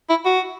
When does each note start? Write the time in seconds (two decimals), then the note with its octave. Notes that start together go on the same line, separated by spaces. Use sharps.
0.10 E4
0.26 F#4